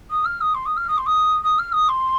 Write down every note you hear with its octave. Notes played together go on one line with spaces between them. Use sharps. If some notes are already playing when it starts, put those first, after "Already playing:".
D#6
F6
D#6
C6
D#6
F6
D#6
C6
D#6
D#6
F6
D#6
C6